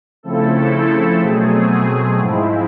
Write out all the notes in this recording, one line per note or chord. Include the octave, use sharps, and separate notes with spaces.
C#3 F3 A3 C4 E4 A4
B2 F#3 A3 C4 G#4
G#2 F3 G#3 C4 E4